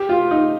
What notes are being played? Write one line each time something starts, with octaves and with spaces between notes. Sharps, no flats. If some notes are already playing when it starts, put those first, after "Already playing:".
Already playing: G4
F4
D#4